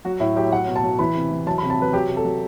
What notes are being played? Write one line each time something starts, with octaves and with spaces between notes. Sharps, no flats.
F#3 F#4
A2 E4
F#3 G4
F#3 F#5
B2
A5
F#3
E3 B5
C3
E3
F#3 A5
B5
C3
A5
F#3 B4
F#3 G4
C3
A4
F#3